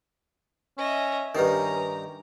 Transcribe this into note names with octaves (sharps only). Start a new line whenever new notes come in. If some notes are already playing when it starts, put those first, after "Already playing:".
C#4 D#5 E5
G2 D#3 C#4 D#4 G4 B4 A#5